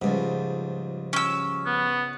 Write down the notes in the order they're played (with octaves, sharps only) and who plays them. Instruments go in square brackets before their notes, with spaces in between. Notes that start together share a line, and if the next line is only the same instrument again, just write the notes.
[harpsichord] C#2 G#2 [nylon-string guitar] F3 G3
[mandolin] C#4 E6
[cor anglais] B3